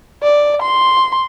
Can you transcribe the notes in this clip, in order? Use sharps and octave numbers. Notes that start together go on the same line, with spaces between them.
D5
C6